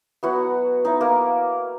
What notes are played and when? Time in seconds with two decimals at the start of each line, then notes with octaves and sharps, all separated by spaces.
0.23 F#3 B3 E4 F#4 F#5
0.84 F#3 B3 D#4 E4 D#5
1.01 A#3 A#4